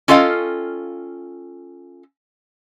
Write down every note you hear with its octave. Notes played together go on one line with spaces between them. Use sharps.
C#4 F4 A4 D#5 F5 G5